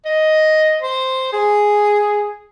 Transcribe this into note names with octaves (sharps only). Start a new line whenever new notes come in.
D#5
C5
G#4